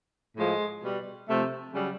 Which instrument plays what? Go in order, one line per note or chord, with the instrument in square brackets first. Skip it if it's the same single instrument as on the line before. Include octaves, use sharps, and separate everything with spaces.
[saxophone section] A2 F3 G#3
B2 G3
C3 F3 A3
C#3 F#3 G3